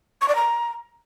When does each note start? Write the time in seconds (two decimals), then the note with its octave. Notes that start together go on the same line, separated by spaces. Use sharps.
0.21 C#6
0.28 D5
0.35 A#5